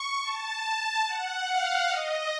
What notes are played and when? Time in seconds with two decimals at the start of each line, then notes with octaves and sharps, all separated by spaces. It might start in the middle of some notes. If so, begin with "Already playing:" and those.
Already playing: C#6
0.23 A5
0.63 A5
1.05 F#5
1.47 F5
1.88 D#5